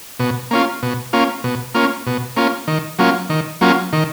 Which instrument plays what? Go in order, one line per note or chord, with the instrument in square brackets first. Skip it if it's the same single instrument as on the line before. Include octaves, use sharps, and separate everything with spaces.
[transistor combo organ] B2
A#3 C#4 F4
B2
A#3 C#4 F4
B2
A#3 C#4 F4
B2
A#3 C#4 F4
D#3
F#3 A#3 C#4 F4
D#3
F#3 A#3 C#4 F4
D#3